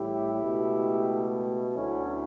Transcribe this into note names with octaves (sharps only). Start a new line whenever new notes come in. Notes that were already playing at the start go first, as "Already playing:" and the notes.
Already playing: A1 A2 G3 E4 G4
C#2 B2 A3
D2 D3 F#3 A3 C#4 E4